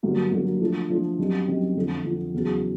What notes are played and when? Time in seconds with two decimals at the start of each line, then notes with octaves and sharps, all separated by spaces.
0.03 G2 D3 F#3 A#3
0.32 G2 D3 F#3 A#3
0.60 F3 A3 D4
0.90 F3 A3 D4
1.19 F#2 D#3 G3 C4
1.48 F#2 D#3 G3 C4
1.76 F2 D3 F3
2.04 F2 D3 F3
2.34 E2 C#3 F#3